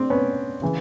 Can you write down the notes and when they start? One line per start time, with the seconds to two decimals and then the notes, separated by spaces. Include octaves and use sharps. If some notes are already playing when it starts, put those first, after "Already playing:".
Already playing: C4 D4
0.10 B3 C#4
0.62 C#3 E3